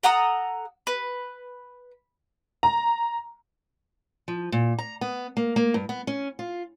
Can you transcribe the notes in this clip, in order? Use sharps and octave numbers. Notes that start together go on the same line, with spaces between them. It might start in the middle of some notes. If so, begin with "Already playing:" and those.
A4 F#5 A#5 D#6
B4
A#5
F3
A#2
A#5
B3
A#3
A#3
G2
B3
C#4
F4